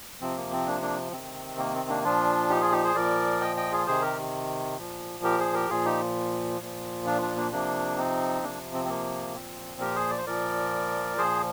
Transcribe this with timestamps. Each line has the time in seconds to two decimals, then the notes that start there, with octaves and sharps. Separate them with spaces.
0.21 C3 F3 C4
0.37 A#3
0.52 C4
0.66 A#3 D4
0.82 A#3 D4
1.12 C3 D#3 C4
1.58 A#3
1.74 C4
1.89 A#3 D4
2.04 A#2 F3 D4 F4
2.50 D#4 G4
2.61 F4 G#4
2.72 D#4 G4
2.84 G#4 C5
2.95 A#2 F3 A#4 D5
3.41 D#5 G5
3.57 D#5 G5
3.72 F4 G#4
3.86 C3 D#3 G#4 C5
4.02 G4 A#4
4.78 A#2 F3
5.24 G4 A#4
5.39 G#4 C5
5.54 G4 A#4
5.70 A#2 F3 F4 G#4
5.85 D#4 G4
6.61 A#2 F3
7.06 D4 F4
7.22 D4 F4
7.36 A#3 D4
7.52 C3 F3 A#3 D4
7.97 C4 D#4
8.43 C3 F3 A#3 D4
8.73 C4
8.85 C4
8.89 A#3
9.35 A#2 F3 C4
9.80 G4 A#4
9.95 G#4 C5
10.10 D5
10.18 C5
10.26 A#2 F3 A#4 D5
11.18 A#2 F3 G#4 C5